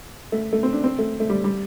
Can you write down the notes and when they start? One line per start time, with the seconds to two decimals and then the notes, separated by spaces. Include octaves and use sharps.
0.32 A3
0.53 A3
0.63 C4
0.73 D4
0.84 C4
0.99 A3
1.20 A3
1.29 G3
1.44 G3